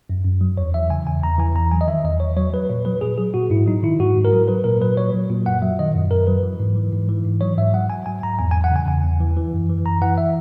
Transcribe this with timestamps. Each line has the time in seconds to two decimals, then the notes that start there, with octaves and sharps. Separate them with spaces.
0.09 F#2
0.25 F#2
0.41 F#3
0.57 E2 C#5
0.74 E3 E5
0.90 C#3 G#5
1.07 E2 G#5
1.23 E2 A#5
1.39 E3 G#5
1.55 E2 A#5
1.71 F#3 G#5
1.81 D#5
1.88 D#3 E5
2.04 E2 D#5
2.20 E2 C#5
2.37 F#3 C#5
2.53 F#3 B4
2.70 A#2 C#5
2.85 F#3 B4
3.01 A#2 G#4
3.18 F#3 G#4
3.34 A#2 F#4
3.50 G#2 E4
3.66 F#3 D#4
3.83 D#3 E4
3.99 G#2 F#4
4.16 G#2
4.25 A#4
4.33 F#3
4.48 F#3 B4
4.64 A#2 A#4
4.81 F#3 B4
4.97 A#2 C#5
5.13 F#3
5.30 A#2
5.46 F#2 F#5
5.62 F#3 E5
5.79 D#3 D#5
5.95 F#2
6.11 F#2 A#4
6.27 F#3 B4
6.43 E3
6.60 G#2
6.76 E3
6.92 G#2
7.09 E3
7.26 G#2
7.41 F#3 C#5
7.58 G#2 E5
7.73 F#3 F#5
7.90 G#2 G#5
8.06 F#3 G#5
8.23 G#2 A#5
8.39 E2 G#5
8.51 G#5
8.56 E3
8.64 F#5
8.72 C#3 G#5
8.87 E2 G#5
9.04 E2
9.20 E3
9.37 E3
9.53 F#2
9.69 E3
9.85 F#2 A#5
10.01 E3 F#5
10.18 E5